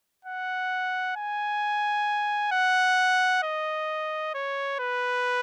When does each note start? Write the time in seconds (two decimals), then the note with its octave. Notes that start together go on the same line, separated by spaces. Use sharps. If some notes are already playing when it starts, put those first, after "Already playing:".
0.25 F#5
1.16 G#5
2.52 F#5
3.43 D#5
4.34 C#5
4.79 B4